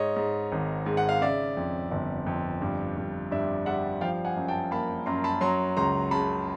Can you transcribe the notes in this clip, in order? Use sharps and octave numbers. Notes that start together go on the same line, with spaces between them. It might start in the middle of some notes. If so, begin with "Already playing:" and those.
Already playing: G#2 C#5 D#5
G#2
G#1
G#2
F#5
F5
C#3 D5 E5
F2
G1
F2
G2
G2
G2 D5 E5
G3 E5 F#5
F3 F5 G5
F#5 G#5
F#2
G5 A5
A#3 A5 B5
F#2 A#5 C6
A5 B5
F#3 A#5 C6
C#2 A#5 C6
C#3 A5 B5